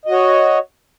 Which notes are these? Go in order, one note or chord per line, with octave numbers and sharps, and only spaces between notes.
F#4 C#5 D#5